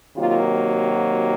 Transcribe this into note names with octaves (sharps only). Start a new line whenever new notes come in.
C3 D#3 F#3 A#3 F4
F#4